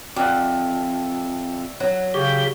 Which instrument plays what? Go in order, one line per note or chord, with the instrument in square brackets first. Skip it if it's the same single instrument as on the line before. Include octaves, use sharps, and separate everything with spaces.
[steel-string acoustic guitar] F2 [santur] D5 E5 F#5
[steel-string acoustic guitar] F#3 [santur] F#5
[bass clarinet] C#3 [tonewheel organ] G4 [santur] C#5